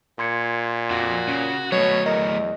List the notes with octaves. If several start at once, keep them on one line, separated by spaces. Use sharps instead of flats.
A#2 C6 G#6 C#7
F2 F#4
C#3
B2 F#3 A3 C#5
E2 A#4 D#5